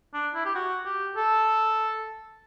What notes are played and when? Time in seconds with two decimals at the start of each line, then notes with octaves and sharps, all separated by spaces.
0.14 D4
0.35 E4
0.45 G4
0.55 F#4
0.86 G4
1.16 A4